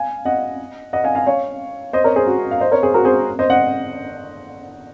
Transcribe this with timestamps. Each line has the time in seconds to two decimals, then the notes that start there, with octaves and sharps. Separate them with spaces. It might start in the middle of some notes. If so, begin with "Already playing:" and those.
Already playing: F5 G#5
0.25 D#5 F#5
0.93 D#5 F#5
1.04 F5 G#5
1.15 F5 G#5
1.27 C#5 F5
1.93 C5 D#5
2.04 A#4 C#5
2.16 G#4 C5
2.27 F#4
2.51 F5
2.60 C5 D#5
2.71 A#4 C#5
2.83 G#4 C5
2.94 F#4 A#4
3.05 G#4 C5
3.39 C5 D#5
3.50 D#5 F#5